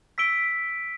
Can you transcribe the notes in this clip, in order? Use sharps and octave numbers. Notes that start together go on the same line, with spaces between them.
E6 B6 D7 G7